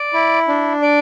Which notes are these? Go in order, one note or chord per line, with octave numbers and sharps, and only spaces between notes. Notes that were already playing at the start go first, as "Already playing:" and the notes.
Already playing: D5
E4
D4
D5